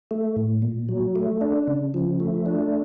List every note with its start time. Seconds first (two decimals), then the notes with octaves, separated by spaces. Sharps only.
0.11 A3
0.37 A2
0.62 A#2
0.89 F#3
1.16 A3
1.41 D4
1.67 C#3
1.94 F3
2.20 A3
2.46 D4